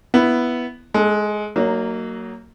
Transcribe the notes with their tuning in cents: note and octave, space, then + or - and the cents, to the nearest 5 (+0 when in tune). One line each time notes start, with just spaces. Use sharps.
B3 +0 E4 +10
G#3 +15 A4 -15
F#3 +20 A#3 -15 D#4 -5